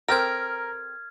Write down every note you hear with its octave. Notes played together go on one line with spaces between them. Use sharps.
C4 G4 A4 A#4 F6 G#6